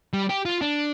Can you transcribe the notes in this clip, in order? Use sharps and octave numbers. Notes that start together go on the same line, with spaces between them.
G3
G4
F4
D4